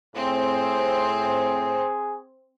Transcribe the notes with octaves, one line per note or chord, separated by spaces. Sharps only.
A2 C4 G#4